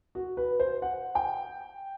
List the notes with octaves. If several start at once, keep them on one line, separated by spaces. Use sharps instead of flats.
F#4
B4
C5
F#5
G5